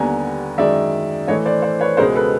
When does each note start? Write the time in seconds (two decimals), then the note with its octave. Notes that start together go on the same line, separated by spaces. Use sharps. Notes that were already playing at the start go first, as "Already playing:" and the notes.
Already playing: D#2 D3 G3 B3 G#5 A#5
0.58 F#2 D#3 G#3 D5 E5
1.27 A2 E3 A3 C#5 D#5
1.46 C5 D5
1.62 C5 D5
1.80 B4 C#5
1.97 C#2 B2 G#3 A#4 C5
2.16 A4 B4